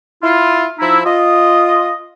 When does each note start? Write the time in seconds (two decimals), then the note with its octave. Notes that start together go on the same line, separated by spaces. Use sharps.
0.23 E4 F4
0.79 F3 D#4 E4
1.05 F4 D#5